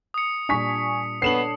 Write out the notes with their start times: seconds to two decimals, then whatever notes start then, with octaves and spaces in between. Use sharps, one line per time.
0.14 D#6 C#7
0.49 A#2 G3 D4 G#5 C#6 B6
1.22 B3 D4 A4 C#5 C7 E7 F#7